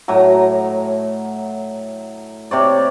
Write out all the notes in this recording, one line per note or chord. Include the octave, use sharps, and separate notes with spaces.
A2 F#3 A#5
C3 C#5 D5